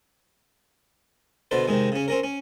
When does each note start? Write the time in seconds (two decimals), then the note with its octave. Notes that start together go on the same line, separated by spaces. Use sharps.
1.51 B2 D3 B4 C5 D5
1.68 C3 D#3 G#3
1.92 C#3 C#4
2.08 C4 C#4 A#4
2.23 C#4